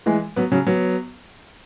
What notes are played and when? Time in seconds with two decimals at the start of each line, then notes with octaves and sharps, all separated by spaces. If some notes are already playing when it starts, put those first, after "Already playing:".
0.06 E3 G#3
0.36 F#3 B3
0.51 C#3 F#3
0.66 F#3 B3